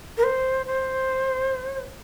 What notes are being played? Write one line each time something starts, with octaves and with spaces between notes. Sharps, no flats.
A#4
C5
C5